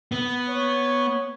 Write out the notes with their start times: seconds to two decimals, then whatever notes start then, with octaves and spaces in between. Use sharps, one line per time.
0.12 B3
0.48 C#5